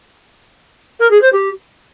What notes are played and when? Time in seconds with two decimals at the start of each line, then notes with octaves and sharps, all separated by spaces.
0.99 A#4
1.10 G#4
1.21 C5
1.32 G4